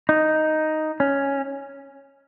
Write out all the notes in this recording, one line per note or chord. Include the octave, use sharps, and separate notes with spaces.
D#4
C#4